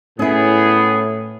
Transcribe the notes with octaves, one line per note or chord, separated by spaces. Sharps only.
A2 B3 C#4 E4 G#4